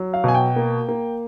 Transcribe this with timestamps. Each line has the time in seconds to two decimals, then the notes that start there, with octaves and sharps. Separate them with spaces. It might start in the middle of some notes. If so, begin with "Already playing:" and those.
Already playing: F#3
0.14 F5
0.24 B2 G#5
0.34 G5
0.56 A#3
0.89 A#3